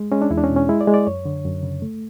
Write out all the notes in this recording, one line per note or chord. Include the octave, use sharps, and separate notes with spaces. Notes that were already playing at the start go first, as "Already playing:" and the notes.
Already playing: G#3
G#3 C#4
D4
E2 E4
D4
C#4
B2
C#4
G#3 E4
D5
G#3
D5
F#2 C#5
D3
F#2
C#3
A3